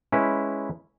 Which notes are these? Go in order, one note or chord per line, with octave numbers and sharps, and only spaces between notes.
G#3 C#4 E4 B4